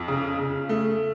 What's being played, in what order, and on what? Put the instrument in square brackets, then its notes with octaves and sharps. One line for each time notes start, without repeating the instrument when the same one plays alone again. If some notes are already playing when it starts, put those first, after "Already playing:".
Already playing: [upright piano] F2
C#3
C#3
A3